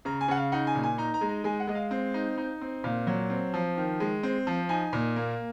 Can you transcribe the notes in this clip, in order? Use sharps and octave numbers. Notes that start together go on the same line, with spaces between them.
C#3 A#5
G#5
C#3 F#5
F5
D#4 F#5
G#5
A#2
G#5
D#4 A#5
A#5
G#3
A#5
G#3 G#5
F#5
G#3 D#5
F5
C4
D#4
D#4
C4
A#2 F5
F#3
C4
F3
D#3
G#3
C4
F3
D#4 G#5
A#2
A#3